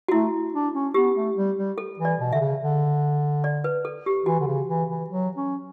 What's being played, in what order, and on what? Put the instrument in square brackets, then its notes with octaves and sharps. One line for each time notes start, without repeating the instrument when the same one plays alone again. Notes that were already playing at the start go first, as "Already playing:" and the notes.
[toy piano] F#4
[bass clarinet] A3 [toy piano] E4
[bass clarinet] D4
C#4
[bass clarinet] B3 [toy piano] G4
[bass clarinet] A3
G3
G3
[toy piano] A4
[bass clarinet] E3
[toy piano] D5
[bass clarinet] B2
[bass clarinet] D3 [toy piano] E5
[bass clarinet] C#3
D3
[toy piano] D5
B4
A4
G4
[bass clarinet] E3 [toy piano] F#4
[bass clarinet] D3
C#3
E3
E3
F#3
C#4